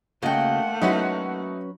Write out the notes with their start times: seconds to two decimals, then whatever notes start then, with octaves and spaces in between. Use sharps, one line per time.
0.22 C#3 A3 A#3 F#4 D#5 F#5 G5
0.82 F#3 C#4 D#4 E4 F#4 B4